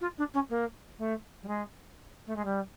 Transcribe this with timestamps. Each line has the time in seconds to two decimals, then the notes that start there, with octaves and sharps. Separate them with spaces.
0.01 F4
0.18 D4
0.34 C#4
0.50 A#3
0.99 A3
1.43 G3
1.47 G#3
2.27 A3
2.36 G#3
2.45 G3